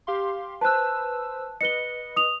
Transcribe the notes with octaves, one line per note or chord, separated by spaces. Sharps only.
G4 F5 C6
B4 C5 A5 E6 F#6
B4 D#5 C#7 G7
D#6 F7